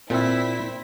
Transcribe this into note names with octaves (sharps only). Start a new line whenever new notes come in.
A#2 C4 E4 E5 B6